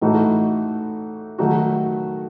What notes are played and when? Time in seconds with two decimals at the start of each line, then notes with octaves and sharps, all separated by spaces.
0.01 A2 E3 A3 D#4 F#4
1.38 D#3 F#3 A3 D#4 F#4